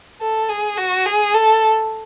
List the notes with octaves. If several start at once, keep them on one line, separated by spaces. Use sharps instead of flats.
A4
G#4
F#4
G#4
A4